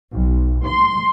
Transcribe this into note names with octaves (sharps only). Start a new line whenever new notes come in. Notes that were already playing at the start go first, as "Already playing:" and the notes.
B1
C6